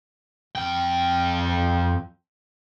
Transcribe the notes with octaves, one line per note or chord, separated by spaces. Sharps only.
F2 G5